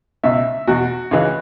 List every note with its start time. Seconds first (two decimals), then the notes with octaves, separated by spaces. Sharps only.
0.23 C#2 B2 E5
0.67 E2 B2 F#4
1.11 C#2 C#3 E3